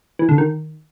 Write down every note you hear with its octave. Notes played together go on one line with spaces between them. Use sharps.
E3
D3
D#3